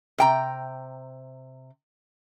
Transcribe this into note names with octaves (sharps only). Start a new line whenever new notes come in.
C3 G5 A#5